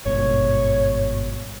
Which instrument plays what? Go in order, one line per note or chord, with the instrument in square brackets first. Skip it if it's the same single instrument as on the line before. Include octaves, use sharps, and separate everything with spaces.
[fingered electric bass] G#1 G2 B2 [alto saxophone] C#5